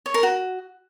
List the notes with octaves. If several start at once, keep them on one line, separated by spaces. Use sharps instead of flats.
C#5
A#4
F#4